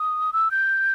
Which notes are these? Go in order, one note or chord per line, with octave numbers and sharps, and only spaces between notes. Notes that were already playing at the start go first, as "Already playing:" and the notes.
Already playing: D#6
E6
G6